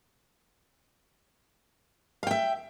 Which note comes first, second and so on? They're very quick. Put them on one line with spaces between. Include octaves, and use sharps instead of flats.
F5 G5 E5